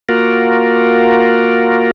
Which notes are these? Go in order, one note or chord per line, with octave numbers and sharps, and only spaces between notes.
A#3 F4 F#4 A#4